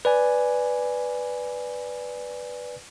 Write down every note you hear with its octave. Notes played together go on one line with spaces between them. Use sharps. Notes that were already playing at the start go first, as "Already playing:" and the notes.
B4 D5 G#5